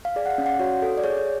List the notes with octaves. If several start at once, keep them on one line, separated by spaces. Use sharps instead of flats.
F5
G#4 D5
F#5
F5
C#4
F#5
F#4 C#5
A4
D5
G#4 C#5